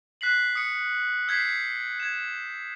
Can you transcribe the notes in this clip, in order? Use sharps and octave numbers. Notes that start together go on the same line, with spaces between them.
F#6 B6 C7 F#7
D#6 C#7
E6 G6 G#6 B6 C7
G#6 E7